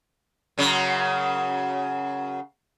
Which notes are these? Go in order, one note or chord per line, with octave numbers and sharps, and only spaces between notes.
F#2 C#3 F#3